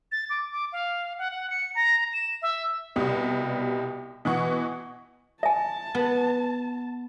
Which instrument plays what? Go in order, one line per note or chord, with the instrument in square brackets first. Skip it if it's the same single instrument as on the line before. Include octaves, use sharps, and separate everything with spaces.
[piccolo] A6
D6
D6
F5
F#5
F#5
C#7
A#5
E7
E5
[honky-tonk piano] C2 B2 G3
B2 E3 F#5 C#6
[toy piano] E5 G#5 [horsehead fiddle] A5
[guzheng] B3